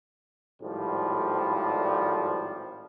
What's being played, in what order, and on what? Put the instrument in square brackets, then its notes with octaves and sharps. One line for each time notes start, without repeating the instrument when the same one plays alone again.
[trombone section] G#1 A2 F3 G3